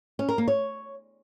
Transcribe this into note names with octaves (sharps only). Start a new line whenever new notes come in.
C#4
A#4
A#3
C#5